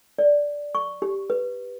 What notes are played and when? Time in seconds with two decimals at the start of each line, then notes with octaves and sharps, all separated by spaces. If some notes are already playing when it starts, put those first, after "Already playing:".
0.18 D5
0.75 C#6
1.02 G4
1.30 B4